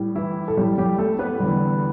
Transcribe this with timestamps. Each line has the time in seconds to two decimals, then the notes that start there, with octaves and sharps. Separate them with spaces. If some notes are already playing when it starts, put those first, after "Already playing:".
Already playing: A2 G3
0.15 E3 E4
0.48 A4
0.57 A2 G3 G4
0.78 G3 G4
0.98 A3 A4
1.19 B3 B4
1.40 E2 D3 G3